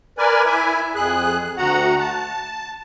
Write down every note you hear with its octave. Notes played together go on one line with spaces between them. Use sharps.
A#4 B4 D5 G#5
E4 E5 G#5
F2 G#4 F#6
D2 F#4 F#5 A#5
A5